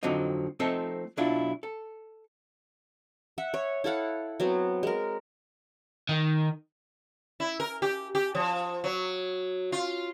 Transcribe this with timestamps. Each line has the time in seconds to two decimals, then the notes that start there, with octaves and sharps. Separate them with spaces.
0.03 F2 D3 F3 F#3 C4 D#4
0.60 F3 A3 C4 D#4 A4
1.17 B1 F#3 D4 E4 F4
1.63 A4
3.38 E5 F#5
3.54 C#5
3.84 E4 A4 F5 F#5
4.40 F#3 B3 C4
4.83 G#3 A#4
6.09 D#3
7.40 E4
7.60 A#4
7.82 G4
8.15 G4
8.35 F3
8.84 F#3
9.72 F4